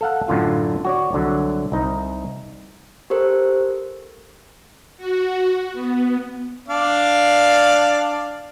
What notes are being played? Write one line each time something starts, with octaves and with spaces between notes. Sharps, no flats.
A4 F5 F#5
F#2 A2 D3 F4 A5
F#4 C#5 D5
C2 D3 F#3
C2 D#4
G4 A4 A#4 C5
F#4
B3
D4 D5 F5